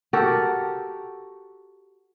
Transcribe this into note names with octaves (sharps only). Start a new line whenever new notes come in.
F#4 G4 A4 A#4